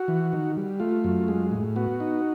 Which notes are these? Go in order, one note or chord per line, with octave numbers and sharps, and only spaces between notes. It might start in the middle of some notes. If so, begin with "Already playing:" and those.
Already playing: F#4
E3
D#3
G3
A3 F4
F#2
G#3
A2
B3 F#4
D#4